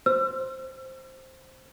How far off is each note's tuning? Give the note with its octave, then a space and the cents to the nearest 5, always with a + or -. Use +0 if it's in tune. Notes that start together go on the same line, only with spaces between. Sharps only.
C5 +5 E6 +45